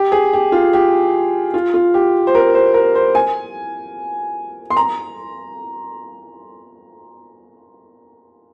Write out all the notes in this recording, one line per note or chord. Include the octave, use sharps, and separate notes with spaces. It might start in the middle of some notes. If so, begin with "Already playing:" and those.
Already playing: G4
G#4
G4
F4
G4
F4
F4
G4
C5
A#4
C5
A#4
C5
G#5
C6
A#5